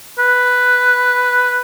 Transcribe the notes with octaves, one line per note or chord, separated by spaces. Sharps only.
B4